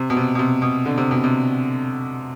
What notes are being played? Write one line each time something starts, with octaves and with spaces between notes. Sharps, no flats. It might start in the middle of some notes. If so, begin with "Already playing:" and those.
Already playing: C3
B2
C3
B2
C3
B2
D3
C3
B2
C3